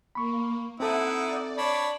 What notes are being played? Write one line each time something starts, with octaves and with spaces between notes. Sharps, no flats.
A#3 B5 C#6
C4 D#4 E4 A4 E5 F#5
D5
D4 C#5 B5